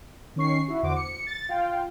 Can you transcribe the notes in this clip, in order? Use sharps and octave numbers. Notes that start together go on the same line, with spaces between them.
D#3 C#4 C#6 C7
E4 F#4
E2 D3 F#4 C5 D6
C#7
A6
F4 F5 G5